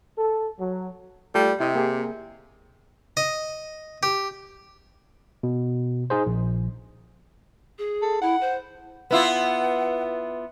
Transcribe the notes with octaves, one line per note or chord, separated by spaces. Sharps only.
A4
F#3
G3 A3 F4 A4
C3 E4 D#5
A#3 G4 G#4
D#5
G4
B2
D#4 G#4 C5
A#1
G#4
A4
E4 F#5
C5
B3 E4 F4 F#5